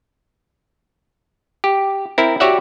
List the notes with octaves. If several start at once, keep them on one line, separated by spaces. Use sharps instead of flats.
G4
C4 E4 A#4
F#4 G4 C#5 D5 E5 F#5